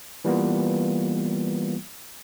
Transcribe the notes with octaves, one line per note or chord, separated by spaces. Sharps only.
E3 G3 A#3 B3 F4